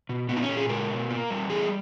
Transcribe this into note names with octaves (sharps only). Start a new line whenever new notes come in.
B2
A#2 B3
D#4
C#4
A#2
G#4
G#3 A#4
B2
A#3
G3
E3 G#4